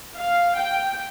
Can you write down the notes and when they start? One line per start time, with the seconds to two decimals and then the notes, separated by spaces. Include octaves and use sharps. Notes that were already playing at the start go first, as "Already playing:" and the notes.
0.17 F5
0.56 G5